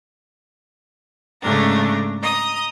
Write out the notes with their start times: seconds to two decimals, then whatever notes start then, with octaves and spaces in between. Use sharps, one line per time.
1.42 G#2 C#3 G#3 A3 D4 A#5
2.22 D#5 A#5 D#6